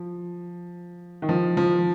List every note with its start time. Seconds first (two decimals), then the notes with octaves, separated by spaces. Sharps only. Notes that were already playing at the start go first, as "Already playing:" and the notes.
Already playing: F3
1.22 D#3
1.29 F3
1.57 F3